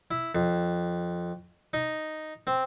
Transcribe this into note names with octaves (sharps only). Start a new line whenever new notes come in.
E4
F2
D#4
C4